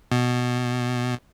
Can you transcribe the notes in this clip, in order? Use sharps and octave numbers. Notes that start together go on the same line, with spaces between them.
B2